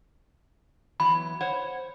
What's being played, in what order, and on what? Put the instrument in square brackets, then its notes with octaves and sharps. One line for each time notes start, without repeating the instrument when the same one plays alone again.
[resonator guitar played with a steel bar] E3 F#3 B3 [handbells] B5
[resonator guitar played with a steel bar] C5 C#5 F#5